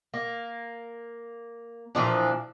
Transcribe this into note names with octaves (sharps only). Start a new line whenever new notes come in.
A#3
A#2 E3 F3 D4